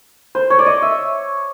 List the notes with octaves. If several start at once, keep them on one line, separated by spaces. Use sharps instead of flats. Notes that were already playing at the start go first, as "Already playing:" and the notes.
C5
C#5
D5
D#5
E5